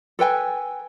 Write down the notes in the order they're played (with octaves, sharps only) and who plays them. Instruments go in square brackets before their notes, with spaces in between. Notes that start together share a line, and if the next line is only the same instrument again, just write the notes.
[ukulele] A4 B4 G5 G#5